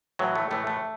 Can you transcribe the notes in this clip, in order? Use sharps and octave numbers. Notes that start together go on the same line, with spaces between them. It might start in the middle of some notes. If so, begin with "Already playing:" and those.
A2 E3 F#3
A3
A2 E3 A3
A3